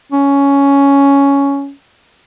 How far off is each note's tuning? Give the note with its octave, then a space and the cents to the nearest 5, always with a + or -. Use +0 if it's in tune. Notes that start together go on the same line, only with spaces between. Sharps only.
C#4 +10